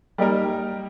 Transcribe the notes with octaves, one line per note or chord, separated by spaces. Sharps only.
G3 A#3 D#4 G4 A#4